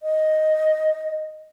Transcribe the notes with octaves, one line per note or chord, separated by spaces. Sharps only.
D#5